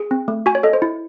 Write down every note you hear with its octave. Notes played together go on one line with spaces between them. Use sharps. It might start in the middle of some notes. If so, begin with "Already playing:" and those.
Already playing: G#4
C4
A3
F#4 G#5
C#5
A4 D#5
C5
E4